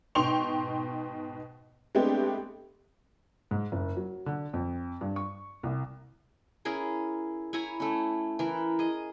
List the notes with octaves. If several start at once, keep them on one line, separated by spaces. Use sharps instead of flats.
G#2 B2 G5 C6 C#6 F7
G#3 A3 B3 C4 D4 G4
G#2
F#1
F#3
D3
F2
G2
C#6
C2
C#4 E4 G#4 A#4
E4 C#5 G#5 A#5
A3 C#4
E3 A#4
G#4 D#5